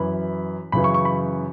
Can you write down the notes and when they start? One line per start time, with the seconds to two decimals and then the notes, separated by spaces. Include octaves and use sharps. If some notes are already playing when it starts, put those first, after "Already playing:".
Already playing: F#2 E3 B5
0.72 F#2 C#3 E3 B5
0.84 C#6
0.94 C#6
1.05 B5